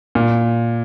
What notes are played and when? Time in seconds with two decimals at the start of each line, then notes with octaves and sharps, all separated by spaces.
0.15 A#2